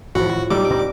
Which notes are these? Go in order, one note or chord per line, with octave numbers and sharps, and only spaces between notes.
G#1 F2 A2 F3 F#4
F#3 G3 A3 B3 C4 D#4 A4 D6
A#2 D4 A#4